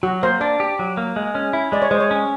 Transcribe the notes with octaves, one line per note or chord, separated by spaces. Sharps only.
F#3 F#4
A#3 C5
D4 D5
G4
F#3
A#3
G#3
C#4
E4
G#3 D5
C#5
G#3 C5
C#5
C#4